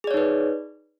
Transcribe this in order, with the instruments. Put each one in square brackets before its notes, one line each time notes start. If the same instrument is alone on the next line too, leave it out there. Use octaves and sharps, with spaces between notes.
[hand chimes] G#4
D5
C#5
D#4
B4